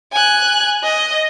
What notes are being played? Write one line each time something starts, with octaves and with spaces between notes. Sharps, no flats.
G#5 F#6
D#5